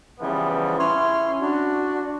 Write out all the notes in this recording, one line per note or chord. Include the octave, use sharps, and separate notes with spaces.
C#3 E3 F3 G3 B3
C#4 E4 C6
D4 F#4